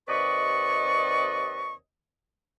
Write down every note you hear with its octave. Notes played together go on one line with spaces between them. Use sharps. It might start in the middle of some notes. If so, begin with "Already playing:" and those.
D#2 C3 B4 D5 D#5 C#6